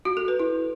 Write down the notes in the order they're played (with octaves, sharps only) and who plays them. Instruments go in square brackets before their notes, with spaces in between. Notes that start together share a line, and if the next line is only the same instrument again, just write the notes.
[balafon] F#4
A4
B4
E4